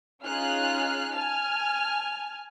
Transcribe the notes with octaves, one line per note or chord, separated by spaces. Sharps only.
C#4 D#4 F4 G#4 F6 F#6
G#5 A5 F6